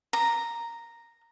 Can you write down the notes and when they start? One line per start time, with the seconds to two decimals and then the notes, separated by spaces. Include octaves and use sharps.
0.13 A#5